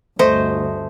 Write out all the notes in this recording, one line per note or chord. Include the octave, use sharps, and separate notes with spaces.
G1 D2 A3 C5 D#5